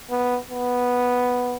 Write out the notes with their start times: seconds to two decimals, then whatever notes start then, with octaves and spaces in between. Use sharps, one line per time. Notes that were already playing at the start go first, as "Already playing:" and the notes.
0.10 B3
0.51 B3